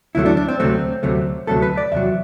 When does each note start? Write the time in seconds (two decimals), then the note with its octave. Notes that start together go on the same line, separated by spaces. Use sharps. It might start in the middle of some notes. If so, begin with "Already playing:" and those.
0.15 D2 C3 F#3 A3 E4
0.26 D4
0.37 D4
0.48 C4
0.60 D2 C3 F#3 A3 C4
1.03 D2 C3 F#3 A3
1.47 D2 C3 F#3 A3 A4
1.62 B4
1.77 D5
1.92 E2 C3 F#3 E5